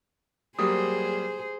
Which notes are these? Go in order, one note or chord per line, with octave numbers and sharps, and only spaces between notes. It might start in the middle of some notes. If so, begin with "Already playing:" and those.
F#3 G3 A#3 G4 G#4 C5 D#6